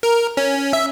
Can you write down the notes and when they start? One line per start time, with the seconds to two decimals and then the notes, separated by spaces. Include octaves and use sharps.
0.03 A#4
0.37 C#4
0.73 E5